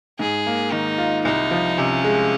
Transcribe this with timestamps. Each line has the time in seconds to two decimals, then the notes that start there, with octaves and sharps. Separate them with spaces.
0.19 G#2 G#4
0.46 A#3
0.72 D#3 D#4
0.98 F4
1.25 C2 D#4
1.51 F3
1.78 C3 C#4
2.04 G#3